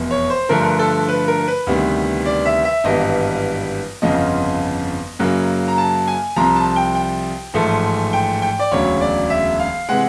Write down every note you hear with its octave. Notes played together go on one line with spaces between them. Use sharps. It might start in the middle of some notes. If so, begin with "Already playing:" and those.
Already playing: F1 E2 B2
C#5
C5
G2 D3 F3 A3 A#4
A4
B4
A#4
B4
D2 C3 D#3 G3 B3
D5
E5
E5
G#1 G2 E3 G3 B3 D#5
G1 F2 C#3 F3 D#5
F#2 C#3 F#3 A#3
A#5
A5
G#5
C2 C3 F3 A#5
A5
G5
G5
A1 G#2 F3 A3
G5
G5
D5
E1 D2 C#3 F#3 C#5
D5
E5
F5
C3 E3 G#3 F#5